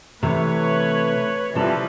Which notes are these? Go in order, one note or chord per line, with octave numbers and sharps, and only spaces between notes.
C3 E3 A3 B4 C#5
C3 E3 F3 G3 A4 B4 A#5